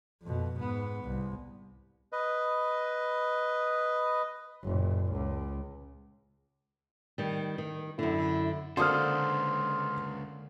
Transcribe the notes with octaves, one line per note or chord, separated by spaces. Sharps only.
F2 B2
G#2 B3
C2
B4 D#5
F#1 A#2
C#2
D#3 G3
D#3
F#2 D3 E4
C#2 D3 A#3 A4 C5 C6 D#6 F6